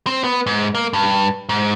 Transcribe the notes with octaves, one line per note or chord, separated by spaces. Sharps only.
C4
B3
G#2
A#3
G2
G#2